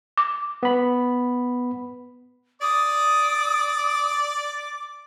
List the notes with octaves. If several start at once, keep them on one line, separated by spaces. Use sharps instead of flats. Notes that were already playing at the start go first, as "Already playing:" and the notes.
D6
B3 B5
D5 D6 D#6